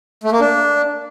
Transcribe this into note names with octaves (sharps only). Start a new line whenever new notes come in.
A3
A#3
D4